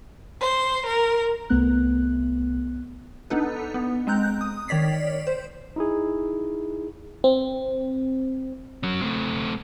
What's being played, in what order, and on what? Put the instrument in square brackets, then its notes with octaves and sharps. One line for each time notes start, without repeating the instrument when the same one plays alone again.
[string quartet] C5
A#4
[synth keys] C2 A3 B3 F#6
[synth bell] B3 D4 D#4 A4 B4
B3
G#3 C4 A#5 F#6 G6
D#6
D#3 C#5 D5 B6 C7
C5
[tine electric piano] D#4 E4 G#4
[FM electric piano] C4
[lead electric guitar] F#3 C#4
A3 C4